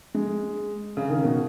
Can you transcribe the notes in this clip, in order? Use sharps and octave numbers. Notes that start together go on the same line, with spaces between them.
G#3
C#3
D#3
B2